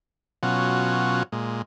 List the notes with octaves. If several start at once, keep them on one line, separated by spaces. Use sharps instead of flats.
B2 F#3 C#4 F4 F#5
A#2 G#3